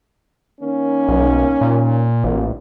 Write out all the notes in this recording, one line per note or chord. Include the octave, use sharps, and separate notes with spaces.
D#3 A#3 C#4
B1
A#2
A1 A#2